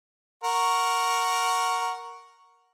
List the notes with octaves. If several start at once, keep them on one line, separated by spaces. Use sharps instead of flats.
A#4 F#5 C#6